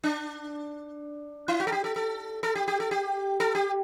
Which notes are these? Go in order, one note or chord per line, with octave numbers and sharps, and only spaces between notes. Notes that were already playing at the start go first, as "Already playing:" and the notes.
D4
E4
F#4
A4
G4
A4
A4
A4
G4
G4
A4
G4
A4
G4